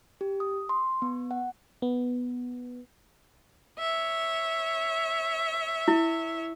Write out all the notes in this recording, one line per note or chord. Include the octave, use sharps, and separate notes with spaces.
G4
D#6
C6
B3
F#5
B3
C#5 E5
E4